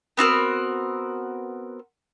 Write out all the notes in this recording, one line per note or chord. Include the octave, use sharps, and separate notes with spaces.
B3 C4 F#4 A#4